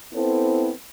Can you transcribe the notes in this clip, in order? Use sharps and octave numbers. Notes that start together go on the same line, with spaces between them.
B3 C4 E4 A4 C5